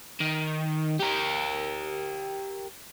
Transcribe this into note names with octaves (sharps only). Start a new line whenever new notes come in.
D#3
G4 A#4